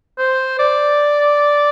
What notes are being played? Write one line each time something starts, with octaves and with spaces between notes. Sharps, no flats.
C5
D5